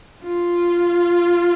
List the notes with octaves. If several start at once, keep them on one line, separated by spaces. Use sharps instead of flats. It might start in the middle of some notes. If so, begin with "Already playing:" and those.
F4